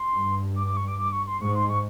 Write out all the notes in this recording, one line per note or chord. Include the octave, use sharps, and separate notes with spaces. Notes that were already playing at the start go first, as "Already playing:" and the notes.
Already playing: C6
G2
D6
D6
C#6
D6
D6
C#6
C6
G#2 C#6
C6
C#6